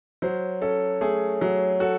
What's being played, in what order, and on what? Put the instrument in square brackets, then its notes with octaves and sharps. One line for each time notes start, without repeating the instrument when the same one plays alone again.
[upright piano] F#3 [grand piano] C5
[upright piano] C#4 [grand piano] A4
[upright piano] A3 [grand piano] G#4
[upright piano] F#3
[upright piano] F#4 [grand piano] A4